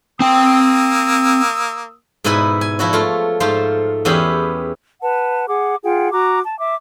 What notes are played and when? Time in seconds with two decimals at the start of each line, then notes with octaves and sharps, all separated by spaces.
0.20 A#3 C4 G5 D#6 E6
2.24 G#2 B2 B3 E4 B4 G#5
2.61 G#5
2.79 F3 E4 F#4 C#5
2.93 A3 F4
3.40 G#2 A3 F4 C5 F5
4.05 E2 B3 C#4 E4 G4 G#4
5.02 B4 F#5 A5
5.48 G#4 F#5 D6
5.84 F4 G#4 F#5 G5
6.12 F#4 A#5 D6
6.45 A5
6.60 E5 D6